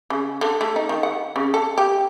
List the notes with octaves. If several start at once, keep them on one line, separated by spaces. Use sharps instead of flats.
C#3
D3
A3
D#4
D#3
F#5
C#3
A4
G4